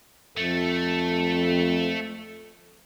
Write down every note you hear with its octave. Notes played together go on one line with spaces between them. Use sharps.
F2 A3 A4